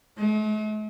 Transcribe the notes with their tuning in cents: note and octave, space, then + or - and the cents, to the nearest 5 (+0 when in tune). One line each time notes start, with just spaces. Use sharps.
A3 -45